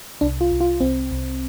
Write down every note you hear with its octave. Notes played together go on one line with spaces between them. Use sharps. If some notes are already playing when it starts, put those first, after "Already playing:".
C2 D4
F4
C2
F4
C2 C4
C2